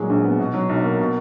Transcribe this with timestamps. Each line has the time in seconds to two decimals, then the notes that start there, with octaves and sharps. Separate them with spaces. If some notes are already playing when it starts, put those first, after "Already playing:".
Already playing: A#2 F#3 G#3
0.09 A#1
0.24 B3
0.39 B2
0.54 F#3
0.69 B1
0.83 A#3
0.99 B2